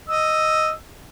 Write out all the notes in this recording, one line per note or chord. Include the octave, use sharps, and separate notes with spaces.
D#5 E6